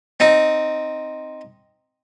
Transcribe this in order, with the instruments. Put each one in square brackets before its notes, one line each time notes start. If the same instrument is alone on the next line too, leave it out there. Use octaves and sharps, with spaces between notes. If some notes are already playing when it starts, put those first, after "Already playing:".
[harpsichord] C4 D#4